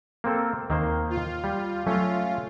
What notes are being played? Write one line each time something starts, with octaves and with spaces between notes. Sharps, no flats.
A#3 C4 A4
D#2 D#3 A#3 C5
F4
G3
F#3 A3 C#4 F4